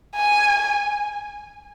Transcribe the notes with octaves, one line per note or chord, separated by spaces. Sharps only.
G#5